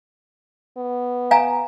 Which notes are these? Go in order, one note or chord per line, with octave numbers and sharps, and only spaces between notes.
B3
F5 G#5 A#5